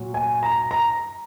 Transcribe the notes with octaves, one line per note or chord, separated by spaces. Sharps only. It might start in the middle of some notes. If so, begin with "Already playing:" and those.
Already playing: A#2 F#3
G#5
A#5
A#5